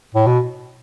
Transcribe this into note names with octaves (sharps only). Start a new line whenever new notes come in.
A2
B2